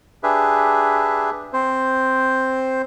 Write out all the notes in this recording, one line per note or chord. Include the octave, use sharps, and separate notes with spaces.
D4 G4 G#4 B4 E5
C4 C5